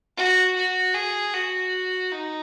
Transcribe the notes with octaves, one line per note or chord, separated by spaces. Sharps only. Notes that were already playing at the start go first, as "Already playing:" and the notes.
F#4
F#4
G#4
F#4
D#4